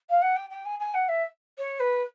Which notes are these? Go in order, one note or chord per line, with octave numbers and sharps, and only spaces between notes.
F5
F#5
G5
G5
G#5
G#5
F#5
E5
C#5
B4